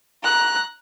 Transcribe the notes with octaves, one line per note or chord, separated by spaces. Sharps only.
A#5 F#6